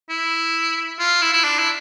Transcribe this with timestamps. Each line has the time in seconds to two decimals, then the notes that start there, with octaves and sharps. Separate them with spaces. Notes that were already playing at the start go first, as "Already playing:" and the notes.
0.09 E4
0.99 F4
1.22 E4
1.33 E4
1.44 D4
1.59 E4